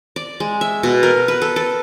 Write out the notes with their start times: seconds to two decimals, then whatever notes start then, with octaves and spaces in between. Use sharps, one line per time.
0.16 D5
0.40 G#3
0.61 E5
0.83 B2
1.03 A#4
1.28 B4
1.42 A4
1.56 A4